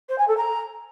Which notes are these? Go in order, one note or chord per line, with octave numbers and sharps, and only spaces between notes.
C5
G#5
A4
A#5